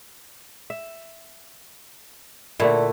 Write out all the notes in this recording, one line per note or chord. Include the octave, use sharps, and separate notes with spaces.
E5
A#2 D3 A3 E4